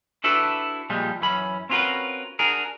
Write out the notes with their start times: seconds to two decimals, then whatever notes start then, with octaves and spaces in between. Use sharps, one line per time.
0.24 D4 E4 F#4 A4 B4 D5
0.90 A#2 F3 G3 G#3
1.21 F#2 E3 C#4 B5
1.70 C4 C#4 F4 F#4 A#4 B4
2.39 D4 F#4 G#4 A#4